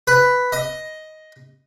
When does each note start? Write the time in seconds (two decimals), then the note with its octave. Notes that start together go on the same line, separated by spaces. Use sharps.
0.07 B4
0.52 D#5